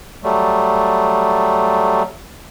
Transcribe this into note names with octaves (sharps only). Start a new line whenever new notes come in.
F#3 G3 A3